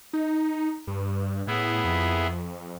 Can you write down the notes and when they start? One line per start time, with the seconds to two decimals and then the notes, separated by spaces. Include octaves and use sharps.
0.13 D#4
0.87 G2
1.47 A2 B3 E4 G#4
1.85 F2